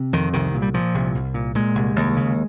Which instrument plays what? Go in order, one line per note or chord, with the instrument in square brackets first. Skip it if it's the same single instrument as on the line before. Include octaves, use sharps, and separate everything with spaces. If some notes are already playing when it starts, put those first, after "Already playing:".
Already playing: [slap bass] C3
F2 D#3
C2 D#3
A#2
G3
A#2 F3
C2
C2
A#2
A#2 G#3
C2
D#2
C#3